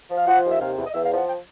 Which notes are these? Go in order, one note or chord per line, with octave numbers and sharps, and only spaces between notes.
F3
F5
F3 F#5
D#2
E5
C3 F5
E2
D#5
E2 E5
F5
F3
F#5
G5